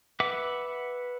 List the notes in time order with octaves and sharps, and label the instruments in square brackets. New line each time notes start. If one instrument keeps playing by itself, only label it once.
[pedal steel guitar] B4 E5 F#5 D6